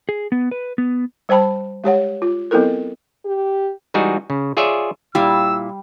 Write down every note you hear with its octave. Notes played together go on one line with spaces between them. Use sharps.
G#4
B3
B4
B3
G3 C5 G5 A5 B5
G#3 G4 C#5 F#5
F4
F#3 B3 C4 E4 A4 A#4
G4
E3 G3 G#3 D#4 F#4 G#4
C#3
F4 G#4 C#5 D5 E5
A#2 G3 E4 F5 E6